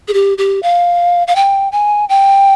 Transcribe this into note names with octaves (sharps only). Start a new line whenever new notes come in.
G#4
G4
G4
F5
F5
G5
G#5
G5